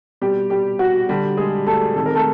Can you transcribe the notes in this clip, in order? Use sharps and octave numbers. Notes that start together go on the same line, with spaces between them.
B2 G3 G4
G3 G4
F#4
D3 G3 G4
G#3 G#4
A3 A4
C3 D#3 G#3 A4
A#4
A3 A4